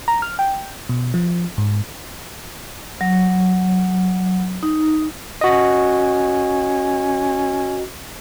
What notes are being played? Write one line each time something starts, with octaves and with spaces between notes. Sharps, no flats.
A#5
F6
G5
B2
F3
G#2
F#3
D#4
C#4 F#4 D#5